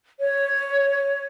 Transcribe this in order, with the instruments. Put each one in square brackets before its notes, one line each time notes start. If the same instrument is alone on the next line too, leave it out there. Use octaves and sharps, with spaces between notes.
[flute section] C#5